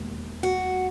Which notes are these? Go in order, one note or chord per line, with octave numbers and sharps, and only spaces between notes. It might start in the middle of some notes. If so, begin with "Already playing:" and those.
Already playing: E1 D#2
F#4